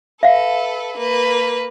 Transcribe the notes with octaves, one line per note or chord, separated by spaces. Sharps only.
A4 B4 E5 F5
A#3 B4